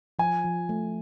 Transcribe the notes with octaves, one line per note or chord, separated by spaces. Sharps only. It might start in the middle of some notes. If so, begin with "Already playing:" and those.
F3 G#5
F3
A3